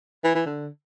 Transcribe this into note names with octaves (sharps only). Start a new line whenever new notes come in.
E3
E3
D3